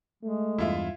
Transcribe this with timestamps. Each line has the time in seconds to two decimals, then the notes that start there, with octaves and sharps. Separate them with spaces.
0.23 G#3 A3
0.58 E2 G2 E4 F4 E5